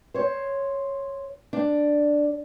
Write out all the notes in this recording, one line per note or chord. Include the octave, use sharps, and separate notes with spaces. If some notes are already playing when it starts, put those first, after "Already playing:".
C5 C#5
D4